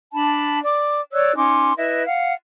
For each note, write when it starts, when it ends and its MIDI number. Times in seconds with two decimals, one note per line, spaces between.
0.13 0.61 62
0.13 0.61 81
0.13 0.61 83
0.63 1.00 74
0.63 1.00 86
1.13 1.36 73
1.13 1.36 74
1.13 1.36 88
1.13 1.36 90
1.36 1.73 61
1.36 1.73 63
1.36 1.73 84
1.36 1.73 86
1.77 2.04 64
1.77 2.04 71
1.77 2.04 75
1.77 2.04 76
2.06 2.33 77
2.06 2.33 78